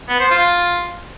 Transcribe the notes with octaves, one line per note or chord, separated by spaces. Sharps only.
B3
C5
F4